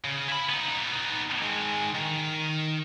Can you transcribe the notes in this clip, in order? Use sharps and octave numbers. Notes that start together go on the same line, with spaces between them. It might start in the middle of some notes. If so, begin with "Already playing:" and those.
C#3
E4 B5
B3 D#4
D#3 G#3
D#3